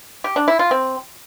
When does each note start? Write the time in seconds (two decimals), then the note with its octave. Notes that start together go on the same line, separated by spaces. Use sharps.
0.24 G4
0.36 D4
0.48 E4
0.59 F4
0.71 C4